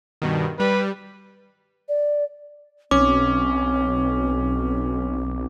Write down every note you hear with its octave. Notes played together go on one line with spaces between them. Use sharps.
G2 B2 D#3
G3 B4
D5
B1 C4 C#4 D6